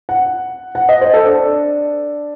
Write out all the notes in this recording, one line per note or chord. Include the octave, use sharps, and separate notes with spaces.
F#5
F#5
D#5
C5
A4
D4